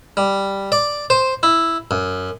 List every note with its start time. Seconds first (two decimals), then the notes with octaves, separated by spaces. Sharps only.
0.17 G3
0.72 D5
1.10 C5
1.43 E4
1.91 F#2